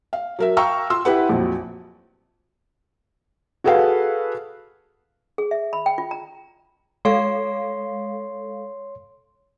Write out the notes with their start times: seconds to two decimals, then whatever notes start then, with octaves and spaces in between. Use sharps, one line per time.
0.13 F5
0.39 F#3 A#4 E5
0.57 F5 G5 A#5 C#6 E6 F6
0.90 F4 C6 E6
1.05 E4 G4 B4 F#5
1.29 A#1 F2 F#3
3.64 F#4 G#4 A4 B4 F5 F#5
5.38 G#4
5.51 E5
5.73 B5
5.86 G5
5.98 F4
6.11 A#5
7.05 G#3 A4 C#5 F5 C6